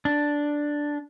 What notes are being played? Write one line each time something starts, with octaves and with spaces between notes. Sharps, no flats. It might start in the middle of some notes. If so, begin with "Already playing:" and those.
D4